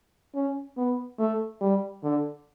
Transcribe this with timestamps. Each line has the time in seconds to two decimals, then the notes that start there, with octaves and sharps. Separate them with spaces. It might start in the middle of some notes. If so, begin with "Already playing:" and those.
0.34 C#4
0.77 B3
1.19 A3
1.61 G3
2.03 D3